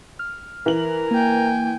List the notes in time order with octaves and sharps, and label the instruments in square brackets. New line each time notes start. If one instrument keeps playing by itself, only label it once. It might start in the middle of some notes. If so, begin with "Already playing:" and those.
[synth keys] F6
[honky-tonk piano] E3 F#7 [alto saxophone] A#4
[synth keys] A#3 [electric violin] G5 G#5